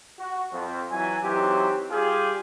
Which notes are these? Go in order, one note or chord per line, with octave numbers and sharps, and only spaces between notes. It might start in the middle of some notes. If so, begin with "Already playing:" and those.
F#4
F2
E3 F#3 G#5
E3 F#3 C4 D#4 G4
G3 F4 G4 G#4